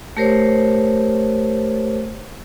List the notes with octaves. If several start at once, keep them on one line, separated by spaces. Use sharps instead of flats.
A3 G4 A#4 C5 C#5